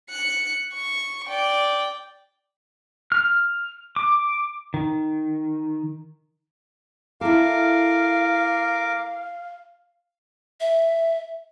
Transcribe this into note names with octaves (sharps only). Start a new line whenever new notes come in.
F#6 C#7
C#6
D5 G5
F6
D6
D#3
E4 A4 A#4 F5 D6
E5